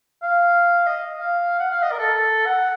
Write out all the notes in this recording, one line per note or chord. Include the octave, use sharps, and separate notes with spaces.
F5
D#5
F5
F#5
F5
D#5
A#4
A4
A4
F#5